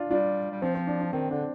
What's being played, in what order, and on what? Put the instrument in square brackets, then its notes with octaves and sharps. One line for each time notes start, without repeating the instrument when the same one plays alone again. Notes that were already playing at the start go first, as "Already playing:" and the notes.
Already playing: [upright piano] D4 F4
[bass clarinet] G3 [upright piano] D4 F4
[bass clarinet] G3
[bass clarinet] F3 [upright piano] C4
[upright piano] C4
D4
D4
[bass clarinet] D#3 [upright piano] C4
[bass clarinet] D3 [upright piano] D4